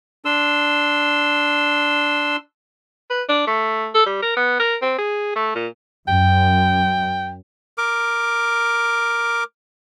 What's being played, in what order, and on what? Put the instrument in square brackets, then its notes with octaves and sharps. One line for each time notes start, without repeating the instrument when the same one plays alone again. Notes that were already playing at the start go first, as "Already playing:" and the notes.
[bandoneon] D4 C6 E6
[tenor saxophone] B4
D4
A3
A4
G3
A#4
B3
A#4
C4
G#4
A3
A#2
[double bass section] F#2 [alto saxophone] G5
[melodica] A#4 D6